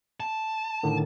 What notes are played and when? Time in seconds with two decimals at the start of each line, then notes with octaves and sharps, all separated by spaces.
0.20 A5
0.83 A2 D3 D#3